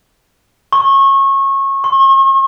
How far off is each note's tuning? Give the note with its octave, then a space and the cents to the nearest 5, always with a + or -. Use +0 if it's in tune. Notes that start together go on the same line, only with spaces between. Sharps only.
C#6 -25
C#6 -45